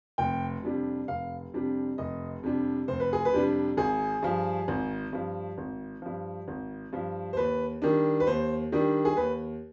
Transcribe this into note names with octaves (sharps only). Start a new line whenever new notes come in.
F1 G5
F2 C3 G3 D4
F1 F5
F2 C3 G3 D4
F1 D#5
F2 C3 G3 D4
F1 C5
B4
G#4
B4
F2 C3 G3 D4
G#1 G#4
G2 F3
G#1
G2 F3
G#1
G2 F3
G#1
G2 F3
C5
D#2 B4
D#3 G3 D4
B4
D#2 C5
D#3 G3 D4
G#4
D#2 B4